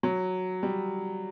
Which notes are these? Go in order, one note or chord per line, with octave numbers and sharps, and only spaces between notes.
F#3
G3